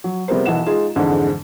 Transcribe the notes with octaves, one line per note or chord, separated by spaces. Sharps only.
F#3
C3 G3 B3 G#4 A#4 C5
B1 E3 F#5 E7
G#3 D#4 F4 G#4
F2 G#2 D3 E3 G#3